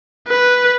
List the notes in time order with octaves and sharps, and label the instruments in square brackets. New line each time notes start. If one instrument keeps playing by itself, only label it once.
[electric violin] B4